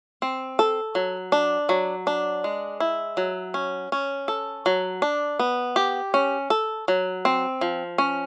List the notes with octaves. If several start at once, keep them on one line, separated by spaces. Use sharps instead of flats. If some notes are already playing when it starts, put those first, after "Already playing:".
C4
A4
F#3
D4
F#3
D4
G#3
E4
F#3
C#4
C#4
A4
F#3
D4
B3
G4
C#4
A4
F#3
C4
F3
C#4